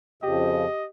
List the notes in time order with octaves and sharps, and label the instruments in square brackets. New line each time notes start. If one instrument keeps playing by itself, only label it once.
[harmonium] F2 C#3 F3 [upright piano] G4 [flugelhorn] D#5